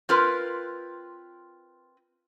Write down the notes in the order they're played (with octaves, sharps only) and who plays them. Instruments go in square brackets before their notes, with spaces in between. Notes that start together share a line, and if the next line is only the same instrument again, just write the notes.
[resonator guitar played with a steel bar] C4 F4 A#4 B4